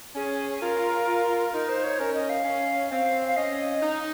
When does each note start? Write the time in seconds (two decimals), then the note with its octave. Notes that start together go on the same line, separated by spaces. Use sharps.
0.15 C#4 G#4
0.62 F4 A#4
1.08 F4
1.53 D#4 A#4
1.69 C5
1.84 C#5
1.99 C#4 A#4
2.14 D#5
2.29 F5
2.45 C#4
2.91 C4 F5
3.27 F5
3.37 C#4 D#5
3.82 D#4